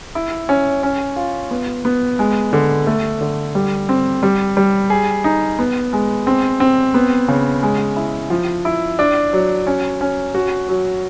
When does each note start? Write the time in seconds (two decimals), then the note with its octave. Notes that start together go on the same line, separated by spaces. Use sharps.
0.15 E4
0.49 C#4
0.83 C#4
1.16 F4
1.51 B3
1.85 B3
2.19 G#3
2.53 D3
2.87 A3
3.21 D3
3.55 G3
3.89 C4
4.23 G3
4.57 G3
4.90 G#4
5.24 D#4
5.59 B3
5.93 G#3
6.27 C4
6.60 C4
6.94 B3
7.28 C#3
7.63 G#3
7.96 E4
8.30 F3
8.65 E4
8.99 D4
9.33 F#3
9.67 C#4
10.01 C#4
10.35 F#4
10.69 F#3